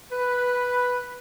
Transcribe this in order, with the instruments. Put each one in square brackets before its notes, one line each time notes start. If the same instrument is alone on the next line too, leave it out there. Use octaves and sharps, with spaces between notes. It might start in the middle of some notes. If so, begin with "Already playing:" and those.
[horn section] B4